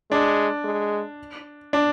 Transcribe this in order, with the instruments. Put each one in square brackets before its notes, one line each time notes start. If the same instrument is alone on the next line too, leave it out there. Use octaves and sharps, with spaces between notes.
[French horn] G#3 [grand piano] D4
[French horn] G#3
[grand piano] D4